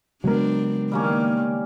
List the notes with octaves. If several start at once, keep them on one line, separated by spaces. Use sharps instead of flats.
C#3 F#3 G#3 B3 C4 D4 A#4
D#3 G3 A#3 C#4